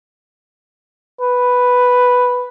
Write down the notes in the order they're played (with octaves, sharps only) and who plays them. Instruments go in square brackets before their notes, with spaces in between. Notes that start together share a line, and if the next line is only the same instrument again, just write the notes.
[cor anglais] B4